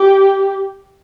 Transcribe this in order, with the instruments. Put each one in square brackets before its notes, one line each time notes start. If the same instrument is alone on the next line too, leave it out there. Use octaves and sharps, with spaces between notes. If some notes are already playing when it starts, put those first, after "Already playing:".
Already playing: [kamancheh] G4